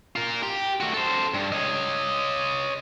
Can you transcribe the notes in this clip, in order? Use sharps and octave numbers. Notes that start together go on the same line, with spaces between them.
F4 A#4
G4
A3 F#4
A4 C5
G2
C#5 D#5